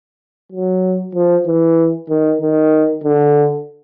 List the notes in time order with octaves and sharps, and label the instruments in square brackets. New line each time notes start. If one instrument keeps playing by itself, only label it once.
[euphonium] F#3
F3
E3
D#3
D#3
D3